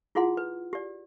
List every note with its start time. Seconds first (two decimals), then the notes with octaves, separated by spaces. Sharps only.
0.15 E4 F4 G#4 F#5 C6
0.37 B4
0.73 G4 D5